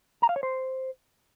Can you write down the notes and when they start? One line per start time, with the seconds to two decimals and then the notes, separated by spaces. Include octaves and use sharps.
0.22 A#5
0.29 F5
0.36 C#5
0.43 C5